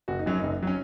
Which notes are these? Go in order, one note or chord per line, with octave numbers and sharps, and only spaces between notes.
F#1 F#4
D#4
F#2 F#3 C#4
F#1 D#4
F#3 C#4